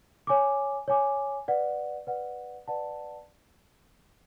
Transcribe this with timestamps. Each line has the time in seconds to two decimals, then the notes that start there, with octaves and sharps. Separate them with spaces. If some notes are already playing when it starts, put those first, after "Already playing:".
0.27 C#5 G#5 D6
0.88 C#5 G#5 D6
1.48 B4 D5 F#5
2.07 B4 D5 F#5
2.68 B4 D5 F#5 A5